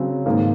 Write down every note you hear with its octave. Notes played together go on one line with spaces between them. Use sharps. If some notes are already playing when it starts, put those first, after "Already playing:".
Already playing: C#3 F#3 C4
G#2 D#3 A#3